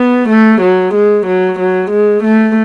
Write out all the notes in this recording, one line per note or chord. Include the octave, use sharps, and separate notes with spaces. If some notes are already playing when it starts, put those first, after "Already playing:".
Already playing: B3
A3
F#3
G#3
F#3
F#3
G#3
A3